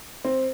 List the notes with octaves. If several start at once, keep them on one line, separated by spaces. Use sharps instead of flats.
C4